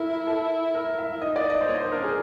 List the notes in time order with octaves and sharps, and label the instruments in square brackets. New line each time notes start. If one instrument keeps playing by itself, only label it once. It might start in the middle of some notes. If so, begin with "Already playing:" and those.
Already playing: [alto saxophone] E4 [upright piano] A4 A#4
[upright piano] A4
A#4
E5
[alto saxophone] E4
[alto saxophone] D#4 [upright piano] D#5
[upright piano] D5
D#5
C5
[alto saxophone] A#3 [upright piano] C#5
[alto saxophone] D#4 [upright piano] C5
[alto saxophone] D4 [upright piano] A#4
[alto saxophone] C#4
[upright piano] G#4